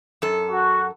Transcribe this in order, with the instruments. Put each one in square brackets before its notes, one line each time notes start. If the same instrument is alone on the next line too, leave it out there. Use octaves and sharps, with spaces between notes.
[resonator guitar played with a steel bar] F#2 A4
[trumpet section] F#4